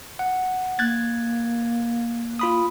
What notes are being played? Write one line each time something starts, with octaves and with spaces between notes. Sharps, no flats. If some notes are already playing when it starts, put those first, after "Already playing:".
F#5
A#3 F#6 G#6 A6
F4 B5 D#6